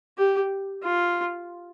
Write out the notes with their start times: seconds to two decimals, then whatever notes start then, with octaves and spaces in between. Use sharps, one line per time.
0.18 G4
0.83 F4